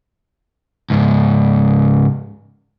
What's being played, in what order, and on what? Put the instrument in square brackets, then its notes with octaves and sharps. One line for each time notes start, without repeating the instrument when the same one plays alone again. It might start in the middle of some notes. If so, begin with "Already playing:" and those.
[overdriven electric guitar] C#2 G#2